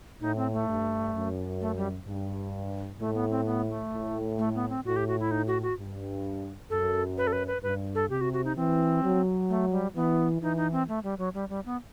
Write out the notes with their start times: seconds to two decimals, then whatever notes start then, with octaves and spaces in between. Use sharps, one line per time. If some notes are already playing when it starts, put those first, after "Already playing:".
0.21 A2 D#4
0.36 C4
0.53 A3
0.68 G2
1.14 F#2
1.61 A3
1.77 G3
2.07 G2
3.00 A2 A3
3.15 B3
3.30 C4
3.46 B3
3.69 A3
3.93 A2
4.38 A3
4.55 B3
4.69 C4
4.85 A2 F#4
4.96 G4
5.08 F#4
5.20 E4
5.31 D#4
5.47 F#4
5.63 F#4
5.77 G2
6.70 F#2 A4
7.18 B4
7.27 A4
7.33 B4
7.47 B4
7.63 G2 B4
7.95 A4
8.09 C3 G4
8.21 F#4
8.33 F#4
8.45 D#4
8.56 E3 C4
9.02 F#3
9.49 A3
9.71 G3
9.95 E3 B3
10.41 E3 D#4
10.57 D#4
10.72 C4
10.88 A3
11.04 G3
11.18 F#3
11.34 G3
11.49 G3
11.66 B3